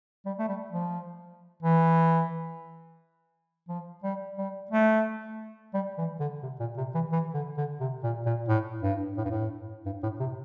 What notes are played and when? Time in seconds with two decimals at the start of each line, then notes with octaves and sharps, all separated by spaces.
0.26 G3
0.39 A3
0.48 G3
0.72 F3
1.63 E3
3.68 F3
4.03 G3
4.38 G3
4.71 A3
5.74 G3
5.98 E3
6.20 D3
6.43 C3
6.60 A#2
6.77 C3
6.94 E3
7.12 E3
7.34 D3
7.57 D3
7.80 C3
8.03 A#2
8.26 A#2
8.48 A2
8.83 G2
9.17 A2
9.25 G2
9.31 A2
9.86 G2
10.03 A2
10.20 C3